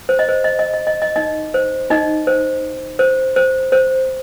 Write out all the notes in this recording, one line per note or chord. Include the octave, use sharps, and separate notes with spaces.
C5
D#5
C5
D#5
D#5
D#5
D#5
D#5
D#4 D#5
C5
D#4 D#5
C5
C5
C5
C5